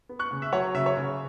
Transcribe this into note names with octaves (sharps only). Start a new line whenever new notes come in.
B3
C#6 F#6
C#3
E5
F#3 C#5 F#5
C#3 E5
C#5
C#3